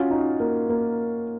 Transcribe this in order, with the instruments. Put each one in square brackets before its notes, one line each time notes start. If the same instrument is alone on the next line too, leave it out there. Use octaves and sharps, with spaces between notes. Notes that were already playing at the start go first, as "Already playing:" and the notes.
Already playing: [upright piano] C#4 F4 [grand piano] F#4
[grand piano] D#4
A#3
A#3